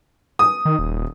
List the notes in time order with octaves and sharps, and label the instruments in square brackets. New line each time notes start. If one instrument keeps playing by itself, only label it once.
[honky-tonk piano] D#6
[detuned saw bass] D#3
D#1